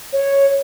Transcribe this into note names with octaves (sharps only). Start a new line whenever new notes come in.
C#5